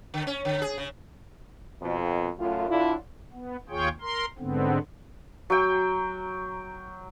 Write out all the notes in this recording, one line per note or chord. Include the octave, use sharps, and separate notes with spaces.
D3
C#4
D3
G#4
C#3
F2 B2
F#2 A2 F4
A2 D3 D4 E4 F4
B3
D#2 F4 G#4 C#5 G5
A#4 C6
G#2 D3 B3 C4
F#3 G5